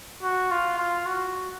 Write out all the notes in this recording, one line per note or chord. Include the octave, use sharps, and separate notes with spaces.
F#4
F4
F4
F#4